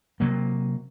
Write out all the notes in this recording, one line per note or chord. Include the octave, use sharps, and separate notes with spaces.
C3 F#3 A#3